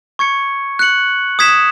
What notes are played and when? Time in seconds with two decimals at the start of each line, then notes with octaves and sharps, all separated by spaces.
0.19 C#6 G#6 C#7
0.79 F#6 C#7 F#7
1.39 D#6 G#6 B6 E7